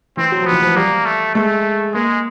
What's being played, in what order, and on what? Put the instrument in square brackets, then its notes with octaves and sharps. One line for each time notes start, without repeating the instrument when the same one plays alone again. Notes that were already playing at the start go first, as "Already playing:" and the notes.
[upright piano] E3 [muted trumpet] C4
[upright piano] F#3
[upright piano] F3 [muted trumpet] B3
[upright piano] E3
F3
[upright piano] G3 [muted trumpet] A#3
[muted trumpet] A3
[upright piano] G#3 [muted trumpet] A3
[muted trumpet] G#3 [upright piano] A#3